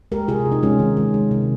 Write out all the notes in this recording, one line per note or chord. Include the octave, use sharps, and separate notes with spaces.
G#3 G4 A#4
C3 F4 G#4
C3
D#4
G#3 C#4 F4
D#3
G#3
G#3
C3